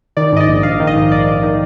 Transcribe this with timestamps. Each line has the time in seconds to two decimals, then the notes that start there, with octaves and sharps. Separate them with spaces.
0.17 D#3 D5
0.33 G#2 D#5
0.40 D5
0.48 A#1
0.63 A#1 F5
0.80 D#3
0.87 D#5
0.96 G#2
1.11 A#1 D5
1.27 A#1
1.43 D#3